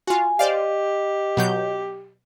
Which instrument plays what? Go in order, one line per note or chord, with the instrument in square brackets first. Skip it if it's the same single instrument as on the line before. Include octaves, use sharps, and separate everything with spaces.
[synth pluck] F4 F#4 [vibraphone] G#5
[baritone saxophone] G4 [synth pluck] C5 D5 F5 [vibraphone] D#5
[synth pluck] B2 F#3 G6